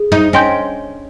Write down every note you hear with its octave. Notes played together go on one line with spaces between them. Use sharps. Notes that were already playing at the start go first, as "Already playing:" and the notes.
Already playing: G#4
D#4
C#4 D#5 G5 C6 G6